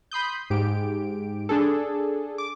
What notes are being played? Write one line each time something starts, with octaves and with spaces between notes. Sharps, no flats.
B5 C6 D#6 G6
G#2 G4 D7
D4 G#4 A4
D6